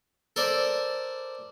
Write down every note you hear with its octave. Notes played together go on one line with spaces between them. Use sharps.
A4 A#4 C5 D5